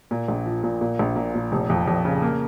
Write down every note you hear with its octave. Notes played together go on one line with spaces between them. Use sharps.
A#2
A#1
F3
A#2
A#2
A#1
A#2
A#2
F1
F2
F2
C#3
A#3